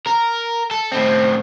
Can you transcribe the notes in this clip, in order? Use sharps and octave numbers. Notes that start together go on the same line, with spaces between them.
A#4
A4
A2 C4